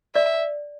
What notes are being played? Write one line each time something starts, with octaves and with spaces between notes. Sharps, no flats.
D5 E5